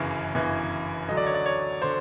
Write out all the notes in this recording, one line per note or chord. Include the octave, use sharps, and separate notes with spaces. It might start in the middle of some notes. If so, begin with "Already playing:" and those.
Already playing: G1 F#2 C#3 E3
G1 F#2 C#3 E3
D2 D3 F#3 D#5
D5
C#5
D5
C#5
D3 C5